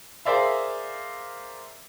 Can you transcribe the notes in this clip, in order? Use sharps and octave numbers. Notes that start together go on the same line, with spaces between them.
G#4 A#4 C5 D5 E5 F5